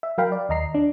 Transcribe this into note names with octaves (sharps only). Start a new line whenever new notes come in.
E5
F#3 A#4 F5 G5 B5
D5
D#2 D#5 A#5 C7
D4